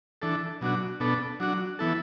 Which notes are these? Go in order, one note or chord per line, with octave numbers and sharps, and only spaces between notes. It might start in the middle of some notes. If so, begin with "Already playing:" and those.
E3 D4 A4
B2 F#3 D4 F#4
B2 B3 D4 A4
F#3 D4 F#4
E3 B3 E4 A4